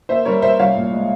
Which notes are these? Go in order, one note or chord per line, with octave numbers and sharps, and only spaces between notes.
A#3 C5 E5
G3 A#4 C#5
A#3 C5 E5
C2 C#5 F5
A#2
G#3